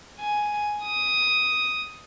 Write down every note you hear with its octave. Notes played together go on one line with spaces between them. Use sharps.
G#5
D#6